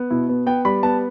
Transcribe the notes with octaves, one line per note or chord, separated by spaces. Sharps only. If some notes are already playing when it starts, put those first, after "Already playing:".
Already playing: B3
B2 E4
B3
B3 G5
G3 B5
B3 A5